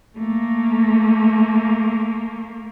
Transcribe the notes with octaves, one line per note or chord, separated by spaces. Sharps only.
A3 A#3